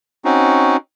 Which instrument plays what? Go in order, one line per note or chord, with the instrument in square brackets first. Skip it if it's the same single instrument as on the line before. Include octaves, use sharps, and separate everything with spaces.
[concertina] C4 C#4 D#4 F#4